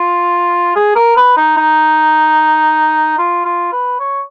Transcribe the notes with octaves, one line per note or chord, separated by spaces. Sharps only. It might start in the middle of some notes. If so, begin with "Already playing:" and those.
Already playing: F4
G#4
A#4
B4
D#4
D#4
F4
F4
B4
C#5